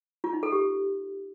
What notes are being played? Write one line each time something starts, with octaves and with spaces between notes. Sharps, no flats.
F4
D#4
A4
G4